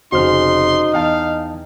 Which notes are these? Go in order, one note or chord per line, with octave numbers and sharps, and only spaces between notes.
F1 C#3 D#4 F#4 G#4 C5 C6 F6
E2 D#5 F5 G5 A5